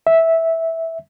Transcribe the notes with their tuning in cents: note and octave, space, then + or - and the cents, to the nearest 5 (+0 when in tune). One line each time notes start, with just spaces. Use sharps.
E5 -10